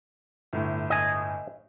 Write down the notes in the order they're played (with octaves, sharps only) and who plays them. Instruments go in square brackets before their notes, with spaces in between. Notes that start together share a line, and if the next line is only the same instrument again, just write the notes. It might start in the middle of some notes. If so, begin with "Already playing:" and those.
[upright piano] G1 A2
[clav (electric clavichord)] D#5 G#5